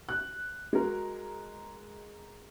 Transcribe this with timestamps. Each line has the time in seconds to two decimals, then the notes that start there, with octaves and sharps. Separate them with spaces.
0.09 F#6
0.73 G#3 F#4 A#4